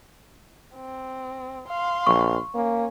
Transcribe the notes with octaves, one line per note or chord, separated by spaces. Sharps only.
C4
F5 C6
A#1 C#6
A#3 C#4